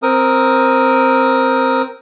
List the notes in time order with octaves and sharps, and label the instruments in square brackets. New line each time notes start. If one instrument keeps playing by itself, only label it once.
[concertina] C4 A#4 D#6